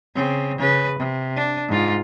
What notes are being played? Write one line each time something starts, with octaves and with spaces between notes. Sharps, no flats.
C#3 C4
C#3 B4
C3
D4
G#2 F4